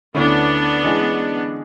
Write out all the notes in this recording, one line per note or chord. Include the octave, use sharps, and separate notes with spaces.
D2 D3 A3 B3 C#4 D4 E4
E3 G#3 C#4 G#4